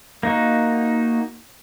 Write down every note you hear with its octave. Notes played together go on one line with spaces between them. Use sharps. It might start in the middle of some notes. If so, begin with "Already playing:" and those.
A#3 D#4 F#4